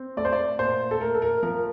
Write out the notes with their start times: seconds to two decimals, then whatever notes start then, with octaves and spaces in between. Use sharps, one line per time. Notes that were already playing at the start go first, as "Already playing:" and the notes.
Already playing: C4
0.17 A3 D5
0.25 C5
0.32 D5
0.59 A#2 C5
0.91 A4
1.01 A3 A#4
1.14 A4
1.22 A#4
1.43 F3 A#4